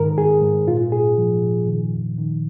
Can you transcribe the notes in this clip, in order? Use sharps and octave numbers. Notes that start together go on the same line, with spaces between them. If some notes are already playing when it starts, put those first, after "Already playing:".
Already playing: G#2 D#3 A#4
G#2 G#4
G#2
A#2 F4
A#2 G#4
F3
A#2
D#3
F2
D#3